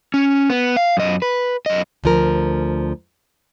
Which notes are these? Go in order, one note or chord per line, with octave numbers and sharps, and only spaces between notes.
C#4
B3
F5
F#2 D#5
B4
F#2 D#5
D2 F3 A#4